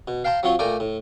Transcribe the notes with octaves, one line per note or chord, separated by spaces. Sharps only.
B2
F5 G5 A5 A#5 C6
F#3 C4 F4 C#5
A#2 A3 D5 G5 G#5 A#5
A2